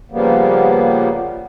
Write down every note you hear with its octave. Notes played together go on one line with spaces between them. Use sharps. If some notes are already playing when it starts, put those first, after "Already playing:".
C#3 F3 G3 A#3 B3